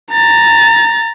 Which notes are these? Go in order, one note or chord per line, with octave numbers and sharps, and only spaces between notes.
A#5 A6